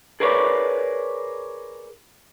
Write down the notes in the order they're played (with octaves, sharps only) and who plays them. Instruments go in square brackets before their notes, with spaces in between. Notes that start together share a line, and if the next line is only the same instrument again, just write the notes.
[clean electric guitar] G#4 A#4 B4 C#5 D5